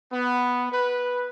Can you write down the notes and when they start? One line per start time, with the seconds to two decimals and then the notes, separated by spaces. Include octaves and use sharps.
0.13 B3
0.73 B4